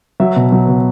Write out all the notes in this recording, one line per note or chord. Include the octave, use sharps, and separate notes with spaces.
F#3 E5
B2
F#3
B2